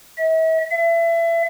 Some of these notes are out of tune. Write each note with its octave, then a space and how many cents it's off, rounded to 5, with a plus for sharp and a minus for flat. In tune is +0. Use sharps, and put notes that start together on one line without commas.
E5 -40
E5 +30